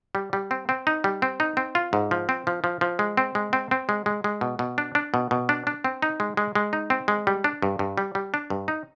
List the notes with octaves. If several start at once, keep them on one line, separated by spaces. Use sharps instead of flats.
G3
G3
C4
C4
D#4
G3
C4
D#4
C4
F4
G#2
F3
C4
F3
F3
F3
G#3
C4
G#3
C4
C4
G#3
G#3
G#3
B2
B2
D4
D4
B2
B2
D4
D4
C4
D#4
G#3
G#3
G#3
D#4
C4
G#3
G3
D4
G2
G2
G3
G3
D4
G2
D#4